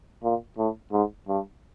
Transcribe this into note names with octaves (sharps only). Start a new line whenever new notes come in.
A#2
A2
G#2
G2